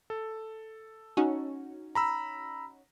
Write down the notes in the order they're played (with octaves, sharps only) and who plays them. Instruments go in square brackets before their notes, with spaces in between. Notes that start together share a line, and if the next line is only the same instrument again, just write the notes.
[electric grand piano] A4
[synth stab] C#4 D#4 F#4
[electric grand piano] A#5 B5 E6